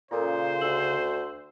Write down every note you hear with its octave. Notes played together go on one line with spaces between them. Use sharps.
A#2 C#3 F4 A4 A#4 C5
D2 E6 F#7